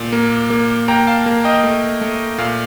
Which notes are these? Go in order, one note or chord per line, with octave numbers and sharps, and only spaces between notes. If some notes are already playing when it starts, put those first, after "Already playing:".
Already playing: A#2
A#3
A#3
A#3 G5 A#5
F5 A5
A#3
D#5 G5
A3
A3
A#2 F5